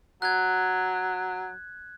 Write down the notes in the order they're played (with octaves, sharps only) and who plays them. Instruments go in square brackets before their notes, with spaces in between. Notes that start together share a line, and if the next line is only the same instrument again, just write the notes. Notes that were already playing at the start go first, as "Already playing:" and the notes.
[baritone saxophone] F#3 [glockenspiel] F#6 G#6